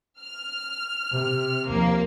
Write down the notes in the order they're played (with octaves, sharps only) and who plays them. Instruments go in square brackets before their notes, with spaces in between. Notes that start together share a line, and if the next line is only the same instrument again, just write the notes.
[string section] F6
[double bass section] C3
[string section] D#2 F3 A#3